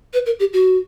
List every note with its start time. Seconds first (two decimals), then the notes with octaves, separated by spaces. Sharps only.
0.14 B4
0.26 A#4
0.39 G4
0.53 F#4